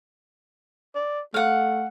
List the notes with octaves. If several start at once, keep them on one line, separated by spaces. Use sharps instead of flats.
D5
A3 F5 F#5